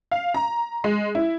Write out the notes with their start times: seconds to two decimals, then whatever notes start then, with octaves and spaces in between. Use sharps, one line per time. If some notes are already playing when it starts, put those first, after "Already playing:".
0.12 F5
0.34 A#5
0.84 G#3
1.15 E4